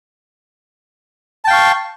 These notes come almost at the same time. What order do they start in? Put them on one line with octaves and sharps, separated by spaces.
A5 G5 F5 C#6